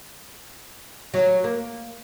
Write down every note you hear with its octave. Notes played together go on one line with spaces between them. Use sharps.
F#3
A#3